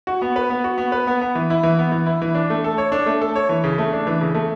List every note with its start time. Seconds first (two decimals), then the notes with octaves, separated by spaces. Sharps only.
0.07 F#4
0.22 B3
0.36 B4
0.50 B3
0.64 F#4
0.78 B3
0.92 B4
1.07 B3
1.21 B3
1.35 E3
1.50 E4
1.63 E3
1.79 B3
1.92 E3
2.06 E4
2.22 E3
2.35 D4
2.50 A3
2.64 A4
2.78 C#5
2.92 D4
3.06 A3
3.21 A4
3.36 C#5
3.49 E3
3.64 C#3
3.78 A3
3.93 D4
4.07 E3
4.21 C#3
4.35 A3